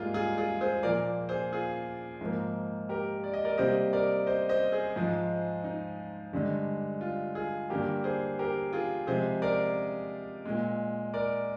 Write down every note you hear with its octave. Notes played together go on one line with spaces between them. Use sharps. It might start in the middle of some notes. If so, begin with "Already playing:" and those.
Already playing: G#2 G3 A#3 F4 G#4
F4 G#4
F4 G#4
G#4 C5
A#2 F3 A#3 A#4 D5
G#4 C5
F4 G#4
G#2 F3 A#3
G4 A#4
D5
D#5
A#4 D5
C3 G3 A#3 C5 D#5
A#4 D5
C5 D#5
C5 D#5
G#4 C5
G#2 F3 G#3
D#4
G2 D3 G#3
F4
F4 G#4
G2 D3 G3 A#3 G4 A#4
G#4 C5
G4 A#4
F4 G#4
C3 F3 G#3 G#4 C5
A#4 D5
A#2 G#3
A#4 D5